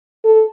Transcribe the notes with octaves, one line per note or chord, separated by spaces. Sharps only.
A4